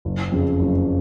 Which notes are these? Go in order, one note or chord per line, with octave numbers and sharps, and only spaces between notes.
F#1
F2 C#3
F#1